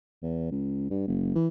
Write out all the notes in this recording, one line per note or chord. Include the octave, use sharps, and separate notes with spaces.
E2
C#2
G2
F#1
E3